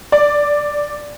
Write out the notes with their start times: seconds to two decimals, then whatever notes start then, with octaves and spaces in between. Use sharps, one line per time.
0.12 D5